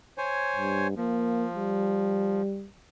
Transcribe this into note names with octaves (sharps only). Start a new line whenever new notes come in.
C5 C#5 G#5
G2
F3 A#3
G3